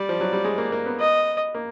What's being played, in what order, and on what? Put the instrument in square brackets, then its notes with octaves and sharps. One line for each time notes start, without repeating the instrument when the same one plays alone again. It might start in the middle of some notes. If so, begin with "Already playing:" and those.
Already playing: [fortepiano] G3 [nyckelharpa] D5
[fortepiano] F3
F#3
G3
G#3
A#3
A#3
B3
[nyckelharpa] D#5
[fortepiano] A#3